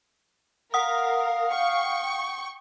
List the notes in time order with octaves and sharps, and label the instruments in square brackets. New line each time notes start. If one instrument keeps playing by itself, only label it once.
[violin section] A#4 [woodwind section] F5 [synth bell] F#5 D#6
[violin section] G5 C#6